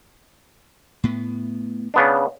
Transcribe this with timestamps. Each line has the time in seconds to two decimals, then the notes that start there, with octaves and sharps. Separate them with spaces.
1.04 A2 B3
1.94 C#3 B3 D4